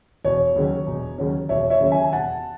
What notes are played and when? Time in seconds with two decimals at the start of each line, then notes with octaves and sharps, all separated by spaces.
0.24 E1 C#5
0.56 D#2 C#3 F#3 C#4
0.87 E1
1.18 D#2 C#3 F#3 C#4
1.49 E1 C#5 E5
1.70 C#5 E5
1.81 D#2 C#3 F#3 C#4
1.92 E5 G#5
2.04 G#5
2.13 E1 F#5 A5